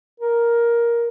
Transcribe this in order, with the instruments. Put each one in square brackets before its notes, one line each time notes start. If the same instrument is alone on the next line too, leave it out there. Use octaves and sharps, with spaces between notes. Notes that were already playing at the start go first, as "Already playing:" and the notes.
[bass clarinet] A#4